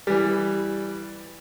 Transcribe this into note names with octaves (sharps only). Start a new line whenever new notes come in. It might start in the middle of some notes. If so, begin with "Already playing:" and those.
E3 G3